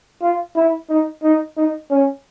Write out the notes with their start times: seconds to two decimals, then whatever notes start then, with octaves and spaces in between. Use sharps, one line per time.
0.22 F4
0.56 E4
0.89 D#4
1.23 D#4
1.57 D#4
1.91 C#4